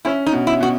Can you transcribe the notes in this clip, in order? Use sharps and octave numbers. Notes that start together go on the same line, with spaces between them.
C#4 E4
D#4
B2
E4
B2 F#4